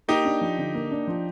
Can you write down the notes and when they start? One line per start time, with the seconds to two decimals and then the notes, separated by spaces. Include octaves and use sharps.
0.08 A#3 D#4 G4
0.25 D4
0.41 F3
0.58 D3
0.75 A#3
0.91 D4
1.08 F3